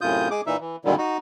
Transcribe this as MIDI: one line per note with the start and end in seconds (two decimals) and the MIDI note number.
0.01 0.28 42
0.01 0.28 45
0.01 0.28 48
0.01 0.28 65
0.01 0.28 87
0.01 0.28 91
0.31 0.41 56
0.31 0.41 68
0.31 0.41 86
0.47 0.57 46
0.47 0.57 52
0.47 0.57 63
0.47 0.57 76
0.60 0.76 52
0.85 0.95 42
0.85 0.95 46
0.85 0.95 50
0.85 0.95 51
0.85 0.95 54
0.85 0.95 55
0.98 1.17 63
0.98 1.17 66